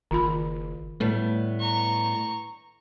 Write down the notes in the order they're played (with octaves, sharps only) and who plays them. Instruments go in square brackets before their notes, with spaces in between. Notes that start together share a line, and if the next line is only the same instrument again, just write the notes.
[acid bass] F#1 [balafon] D#3 F4 B5
[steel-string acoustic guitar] A2 B3 [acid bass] G3
[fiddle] A#5 C#6